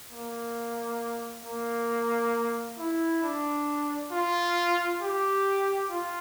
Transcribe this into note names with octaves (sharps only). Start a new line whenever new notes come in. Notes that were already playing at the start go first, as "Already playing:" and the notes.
A#3
A#3
E4
D4
F4
G4
F4